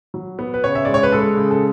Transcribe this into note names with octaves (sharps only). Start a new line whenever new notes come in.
F#3
B3
B4
C#3 C#5
E5
G#3 D5
C#5
B4
G#3 A4
C#3
A4